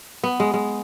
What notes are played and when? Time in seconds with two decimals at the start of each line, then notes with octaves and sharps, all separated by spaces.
0.24 B3
0.40 G#3
0.54 G#3